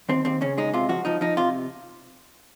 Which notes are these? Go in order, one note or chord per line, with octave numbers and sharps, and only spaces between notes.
D#2 C4
D#2 C4
C#3 C#4
G#3 D#4
C3 F4
F3 F#4
F3 D#4
F3 D#4
C3 F4